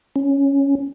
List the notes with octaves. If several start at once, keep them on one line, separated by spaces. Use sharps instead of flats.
C#4